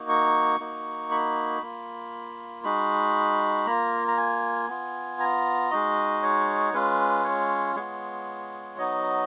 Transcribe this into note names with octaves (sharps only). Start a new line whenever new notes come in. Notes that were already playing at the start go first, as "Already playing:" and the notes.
Already playing: A#3 D#4 F#4
C#6
A#3 D#4 F#4
B5
A#3 F4
G#3 D#4 F#4 B5
A#3 F4 A#5
A#5
G#5
B3 F4
A#5
G#3 D#4 F#4 D#5
C#5
G#3 C#4 F4 B4
C#5
G#3 B3 F4 C#5
F#3 B3 D#4 F#4 D#5